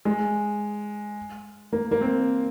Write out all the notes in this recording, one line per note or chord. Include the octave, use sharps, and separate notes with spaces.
G#3
A#3
A#3
C4